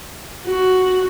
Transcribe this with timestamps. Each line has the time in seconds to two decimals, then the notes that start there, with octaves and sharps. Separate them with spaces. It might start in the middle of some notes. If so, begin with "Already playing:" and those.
0.47 F#4